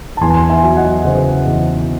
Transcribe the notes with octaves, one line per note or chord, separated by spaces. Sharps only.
A5
E2 G#5 C6
E5 G#5
F#3
D#5 F#5
C#3 C5 D#5
E2